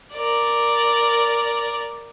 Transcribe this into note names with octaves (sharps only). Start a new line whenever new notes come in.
A#4 D5